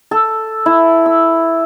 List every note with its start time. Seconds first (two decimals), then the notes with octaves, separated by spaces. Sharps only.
0.11 A4
0.66 E4
1.06 E6